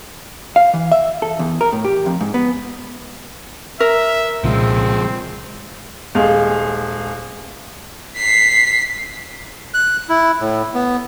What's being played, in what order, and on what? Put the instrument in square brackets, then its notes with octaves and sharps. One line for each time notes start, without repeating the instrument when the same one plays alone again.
[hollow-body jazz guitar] F5
E3
E5
A4
E2
A#4
A2
G4
F2
G#2
B3
[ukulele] A#4 [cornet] E5
[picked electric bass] C2 A#2 C#3 [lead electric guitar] F3 G#3 [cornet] C4
[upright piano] D#1 G#3 F5
[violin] B6 C7
[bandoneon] F#6
E4
A2
B3